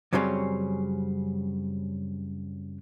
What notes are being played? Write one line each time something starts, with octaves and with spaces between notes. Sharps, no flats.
F#2 C#3 F#3 G3 C4 C#4